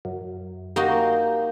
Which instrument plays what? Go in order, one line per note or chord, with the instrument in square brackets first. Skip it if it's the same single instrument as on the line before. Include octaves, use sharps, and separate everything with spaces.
[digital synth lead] F#2
[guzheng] A#3 D#4 F#4 [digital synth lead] G4